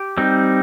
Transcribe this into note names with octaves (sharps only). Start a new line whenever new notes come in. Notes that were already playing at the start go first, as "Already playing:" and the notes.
Already playing: G4
G3 C4 D#4